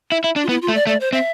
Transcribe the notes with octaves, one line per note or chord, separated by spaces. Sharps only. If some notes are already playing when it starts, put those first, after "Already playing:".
E4
E4
D4
F4
B3 E4
F4
A3
D5
A3 D5
C5
C4 E5